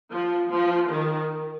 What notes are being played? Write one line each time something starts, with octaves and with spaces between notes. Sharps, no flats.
F3
F3
D#3